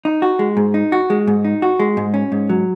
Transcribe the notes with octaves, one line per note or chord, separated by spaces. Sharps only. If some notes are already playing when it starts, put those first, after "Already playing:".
D#4
F#4
G#3
G#2
D#4
F#4
G#3
G#2
D#4
F#4
G#3
G#2
C#4
G#2
F#3